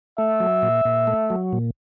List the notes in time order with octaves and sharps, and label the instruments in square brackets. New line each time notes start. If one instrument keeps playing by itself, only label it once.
[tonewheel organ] A3 [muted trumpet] E5
[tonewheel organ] F#3
A#2
A#2
A3
F#3
A#2